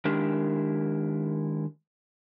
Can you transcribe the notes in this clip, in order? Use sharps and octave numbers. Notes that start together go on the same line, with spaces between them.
D#3 G#3 D4 E4 G4 A#4